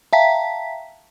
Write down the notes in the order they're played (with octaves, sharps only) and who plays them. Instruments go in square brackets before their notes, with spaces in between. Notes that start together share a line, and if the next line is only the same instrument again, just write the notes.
[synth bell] E5 F5 G5 A5 A#5 B6